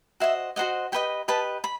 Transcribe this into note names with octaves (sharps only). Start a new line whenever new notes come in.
F#4 C5 D#5 E5
F#4 C5 D#5 F#5
G4 B4 D#5 G5
G4 B4 D#5 A5
B5